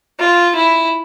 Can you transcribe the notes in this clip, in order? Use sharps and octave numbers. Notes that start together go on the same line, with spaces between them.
F4
E4